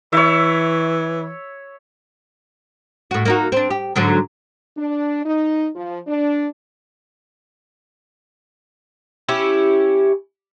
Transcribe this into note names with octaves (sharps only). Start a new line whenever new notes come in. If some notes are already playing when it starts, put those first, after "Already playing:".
E3 C#5 E5
A2 F#4
A#3 D#4 F#4
C4 D4
G4
G#2 D3 F#3
D4
D#4
F3
D4
C#4 E4 G4